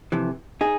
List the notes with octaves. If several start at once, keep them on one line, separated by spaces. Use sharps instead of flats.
F2 C3 E3
D#4 G#4